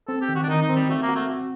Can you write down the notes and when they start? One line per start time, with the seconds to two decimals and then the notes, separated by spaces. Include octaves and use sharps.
0.08 C4 A4
0.22 G4
0.29 D#3
0.35 F#4
0.43 D4
0.48 D#3 D#4
0.62 D#4
0.69 C4
0.76 G3
0.89 A3 F#4
1.02 A#3
1.09 F#4
1.16 A3
1.29 F#4